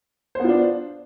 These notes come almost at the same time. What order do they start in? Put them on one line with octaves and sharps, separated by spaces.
C5 B3 F4 D4